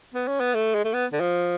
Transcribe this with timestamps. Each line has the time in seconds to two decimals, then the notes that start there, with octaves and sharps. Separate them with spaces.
0.14 B3
0.28 C#4
0.40 B3
0.54 A3
0.75 G#3
0.85 A3
0.94 B3
1.12 D3
1.20 F3